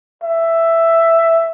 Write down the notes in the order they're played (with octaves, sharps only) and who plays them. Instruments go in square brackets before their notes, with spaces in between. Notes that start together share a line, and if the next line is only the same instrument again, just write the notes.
[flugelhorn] E5